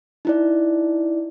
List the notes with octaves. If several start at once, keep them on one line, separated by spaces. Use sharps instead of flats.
D#4 E4 D5